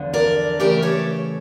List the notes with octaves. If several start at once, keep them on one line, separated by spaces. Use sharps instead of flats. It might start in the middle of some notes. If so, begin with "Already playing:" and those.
Already playing: E2 D3 F3
A#4 D5
C#3 E3 A3 G4 A#4
A4 C#5